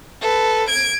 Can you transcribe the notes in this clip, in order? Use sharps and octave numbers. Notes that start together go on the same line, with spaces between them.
A4 B4
G#6 D7